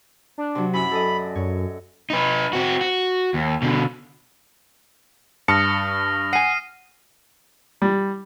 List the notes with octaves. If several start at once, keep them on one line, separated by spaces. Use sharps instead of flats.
D4
C3 F#3
F#2 C#4 E4 B5
A4 D5 D#5
F#2 C#5
D#4 B4
C4 F#4
F#4
D#2
B2 D3
G2 A5 D#6 F6 A#6 C#7
F#5 G#5 C7 D#7
G3